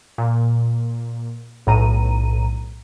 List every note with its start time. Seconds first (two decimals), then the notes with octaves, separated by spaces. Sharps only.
0.18 A#2
1.67 B1 A2 A#5 D#7